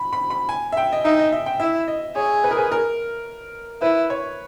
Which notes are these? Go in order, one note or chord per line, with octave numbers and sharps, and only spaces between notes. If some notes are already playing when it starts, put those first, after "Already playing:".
Already playing: B5
B5
B5
G#5
E5
G5
D#5
D#4 E5
D#5
E5
G5
E4 E5
D#5
G#4 C#5
B4
A#4
B4
A#4
E4 B4
C#5